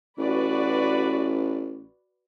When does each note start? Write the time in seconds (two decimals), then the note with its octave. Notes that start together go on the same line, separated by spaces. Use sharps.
0.18 A1 F#4 B4 D5